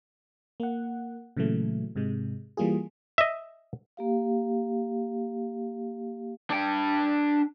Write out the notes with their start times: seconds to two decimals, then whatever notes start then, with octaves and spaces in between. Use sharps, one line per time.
0.60 A#3 F#5
1.37 A#2 C#3 E3 F#3 A3
1.96 G#2 C3 G#3
2.57 E3 G3 A#3 F4 G#4
3.18 D#5 E5
3.97 A#3 G4 F5
6.50 D4 G5